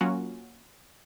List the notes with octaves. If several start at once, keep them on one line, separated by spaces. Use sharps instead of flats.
F#3 A#3 C#4 F4 F#4